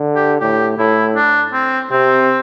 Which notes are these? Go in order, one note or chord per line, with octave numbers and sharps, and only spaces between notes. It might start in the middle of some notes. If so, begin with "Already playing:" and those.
Already playing: D3
G4
A2 G4
A2 E4
D4
C4
C3 C4